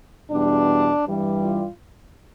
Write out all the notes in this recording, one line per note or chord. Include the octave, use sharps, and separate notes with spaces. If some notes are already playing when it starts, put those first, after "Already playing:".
E2 B2 G3 D4
G2 E3 G3
F4